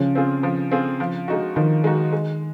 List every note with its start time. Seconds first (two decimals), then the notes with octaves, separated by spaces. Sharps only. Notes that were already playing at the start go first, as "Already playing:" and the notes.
Already playing: C#3 F3
0.15 C4 F4 G#4
0.43 F3
0.71 C4 F4 G#4
1.00 F3
1.28 G#3 D#4 F#4
1.56 D#3 F3
1.84 G#3 D#4 F#4
2.13 G#3